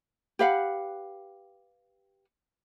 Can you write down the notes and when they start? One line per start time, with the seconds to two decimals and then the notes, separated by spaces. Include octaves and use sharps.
0.39 G4 B4 F5 F#5